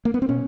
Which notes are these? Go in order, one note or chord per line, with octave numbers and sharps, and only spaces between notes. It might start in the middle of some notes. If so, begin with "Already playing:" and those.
A#3
B3
C4
B2 C#4